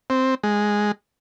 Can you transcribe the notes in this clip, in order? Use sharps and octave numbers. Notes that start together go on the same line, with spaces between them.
C4
G#3